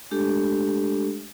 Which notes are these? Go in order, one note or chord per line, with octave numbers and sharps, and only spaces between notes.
G#3 A3 D4 G4 A4